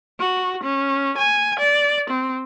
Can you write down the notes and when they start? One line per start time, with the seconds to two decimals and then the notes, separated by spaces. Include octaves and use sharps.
0.19 F#4
0.64 C#4
1.18 G#5
1.59 D5
2.10 C4